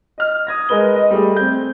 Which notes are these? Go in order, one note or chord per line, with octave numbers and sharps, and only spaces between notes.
D#5 F6
D#6 G#6 A#6
G#3 A#4 B4 G7
D#5
G3 A3 G#4
C4 G6